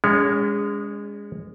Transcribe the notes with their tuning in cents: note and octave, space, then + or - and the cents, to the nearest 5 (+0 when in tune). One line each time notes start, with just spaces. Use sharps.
G#3 -20 C#4 +45 C#5 +15